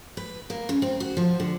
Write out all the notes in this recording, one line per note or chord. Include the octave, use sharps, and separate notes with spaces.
B4
A#3
C#3
C4
F#4
F3
D3